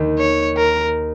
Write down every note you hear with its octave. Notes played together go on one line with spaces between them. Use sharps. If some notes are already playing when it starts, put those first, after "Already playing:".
Already playing: D#2 D#3 A#3
C#5
A#4